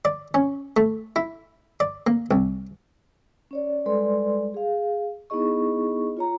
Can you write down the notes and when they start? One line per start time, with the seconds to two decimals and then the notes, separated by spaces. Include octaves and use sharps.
0.05 D5
0.34 C#4
0.77 A3
1.16 E4
1.80 D5
2.07 A#3
2.31 C2
3.51 C#4 C#5 D5
3.86 G3 G#3 A4 B4 D5 C6
4.54 G#4 F5
5.30 B3 D#4 E4 G#4 D#5 C#6
6.17 F4 C#5 A#5